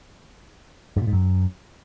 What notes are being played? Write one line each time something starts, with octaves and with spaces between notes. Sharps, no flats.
G2
A#2
G#2
F#2